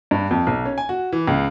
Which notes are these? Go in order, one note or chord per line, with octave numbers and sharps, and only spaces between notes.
G2
F2
B1
C#4
G#5
F#4
E3
C#2